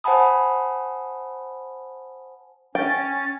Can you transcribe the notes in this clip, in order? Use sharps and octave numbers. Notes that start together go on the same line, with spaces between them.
C5 F#5 G#5 A5 B5 D#6
C#4 G5 A6